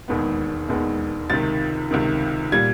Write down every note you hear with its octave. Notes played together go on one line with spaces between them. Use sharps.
E1 D#2 D#3 G#3 B3
E1 D#2 D#3 G#3 B3
C#2 C3 D#3 A6
C#2 C3 D#3
A#2 G3 G#6